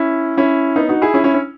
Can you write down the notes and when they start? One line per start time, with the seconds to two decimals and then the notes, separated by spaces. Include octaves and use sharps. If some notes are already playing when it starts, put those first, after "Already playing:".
Already playing: C#4 E4
0.37 C#4 E4
0.76 B3 D#4
0.89 D#4 F#4
1.02 E4 G#4
1.14 C#4 E4
1.24 C#4 E4
1.34 C#4